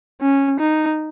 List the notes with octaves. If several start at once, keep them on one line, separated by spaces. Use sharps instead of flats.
C#4
D#4